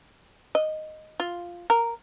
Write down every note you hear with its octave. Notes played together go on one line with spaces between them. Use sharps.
D#5
F4
A#4